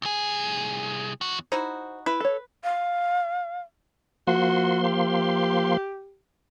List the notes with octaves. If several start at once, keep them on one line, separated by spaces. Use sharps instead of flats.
C2 G#4
E2 F#4
D#4 E4 F#4 C5
E4 B4
A4 C#5
F5
F3 A#3 F#4 C6
G4